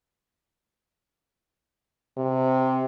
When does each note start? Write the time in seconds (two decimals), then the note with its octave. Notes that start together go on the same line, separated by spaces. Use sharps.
2.18 C3